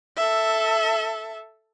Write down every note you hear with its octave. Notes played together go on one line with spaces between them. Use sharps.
A4 E5